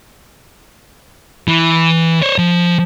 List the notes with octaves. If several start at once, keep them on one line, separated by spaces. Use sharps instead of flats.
E3
C5 C#5
F3